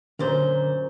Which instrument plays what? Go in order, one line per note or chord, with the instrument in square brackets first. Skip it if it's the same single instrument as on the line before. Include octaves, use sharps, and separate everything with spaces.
[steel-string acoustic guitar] F#2 A#2 C5 [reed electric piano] D3